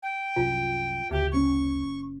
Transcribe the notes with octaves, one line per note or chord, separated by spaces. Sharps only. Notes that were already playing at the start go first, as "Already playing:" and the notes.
G5
C2 F#2 F4
F#1 D2 G4
F#1 A2 C#4 C#6